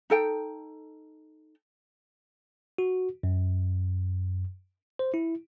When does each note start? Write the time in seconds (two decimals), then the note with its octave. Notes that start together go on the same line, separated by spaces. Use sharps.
0.10 D#4 A4 G5
2.78 F#4
3.23 F#2
4.99 C5
5.14 E4